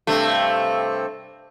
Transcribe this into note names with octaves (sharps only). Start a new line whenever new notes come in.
G2 C3 A3